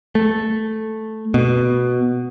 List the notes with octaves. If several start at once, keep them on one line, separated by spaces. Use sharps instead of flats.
A3
B2